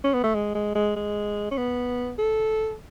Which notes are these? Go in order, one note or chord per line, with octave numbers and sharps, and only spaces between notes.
C#4
B3
A3
G#3
G#3
G#3
G#3
C#4
B3
A4